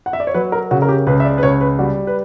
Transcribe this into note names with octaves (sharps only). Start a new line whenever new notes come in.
F#5
E5
D5
C#5
F#3 B4
A#4
C#3 F#4
A#4
G4
C#2 B4
E5
D5
B4
C#2 C#5
B4
G3 F#4
B4